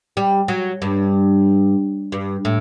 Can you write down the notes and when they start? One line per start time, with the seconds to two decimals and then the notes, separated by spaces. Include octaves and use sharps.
0.17 G3
0.48 F#3
0.82 G2
2.12 G2
2.45 A2